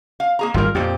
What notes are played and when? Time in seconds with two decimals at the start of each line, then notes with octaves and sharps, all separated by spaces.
0.20 F5
0.39 A#3 G#4 A#5
0.54 G#1 G3 F4 A#4
0.75 F2 A#2 C4 G4